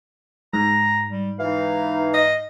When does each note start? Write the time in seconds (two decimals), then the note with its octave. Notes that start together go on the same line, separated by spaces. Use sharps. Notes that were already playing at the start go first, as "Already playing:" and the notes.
0.53 G#2 A#5
1.11 G3
1.39 E3 D#4 F5
2.14 D#5